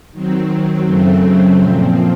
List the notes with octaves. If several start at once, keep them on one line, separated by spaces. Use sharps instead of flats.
D#3 F#3 C4
F#2 C#3 F#3 A3 C4
A#2 F3 C4